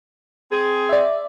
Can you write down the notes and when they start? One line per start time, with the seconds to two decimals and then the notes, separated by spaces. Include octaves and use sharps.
0.50 C4 G#4
0.89 D5 E5